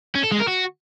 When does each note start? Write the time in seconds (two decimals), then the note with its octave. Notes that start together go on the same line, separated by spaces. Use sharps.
0.15 C#4
0.23 A4
0.31 G#3
0.40 A#4
0.48 F#4